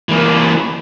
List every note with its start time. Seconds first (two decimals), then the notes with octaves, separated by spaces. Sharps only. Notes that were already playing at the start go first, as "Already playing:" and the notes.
0.09 E3 A#3